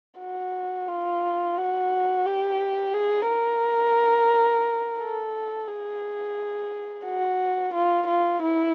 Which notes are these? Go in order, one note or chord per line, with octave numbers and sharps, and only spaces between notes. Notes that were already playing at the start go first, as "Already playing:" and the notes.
F#4
F4
F#4
G4
G#4
A#4
A4
G#4
F#4
F4
F4
E4